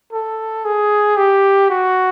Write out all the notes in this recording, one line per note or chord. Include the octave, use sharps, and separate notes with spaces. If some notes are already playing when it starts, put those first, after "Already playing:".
A4
G#4
G4
F#4